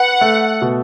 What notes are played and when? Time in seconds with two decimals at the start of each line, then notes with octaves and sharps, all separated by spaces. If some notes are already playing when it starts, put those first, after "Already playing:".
Already playing: B4 F#5
0.21 A3
0.61 B2